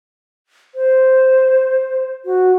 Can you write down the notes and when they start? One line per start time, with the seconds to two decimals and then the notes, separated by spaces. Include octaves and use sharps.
0.75 C5
2.25 F#4